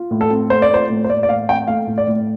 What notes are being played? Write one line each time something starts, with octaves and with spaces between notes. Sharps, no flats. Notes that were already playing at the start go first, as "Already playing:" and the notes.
Already playing: F4
A2
A4
C4
A3 C5
D5
F4 C5
A2
C5
A2 D5
D5
A2 F5
C4 G5
A3 F5
A2
D5
A2